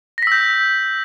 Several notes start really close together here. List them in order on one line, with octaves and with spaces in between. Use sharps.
A#6 B6 E6 G6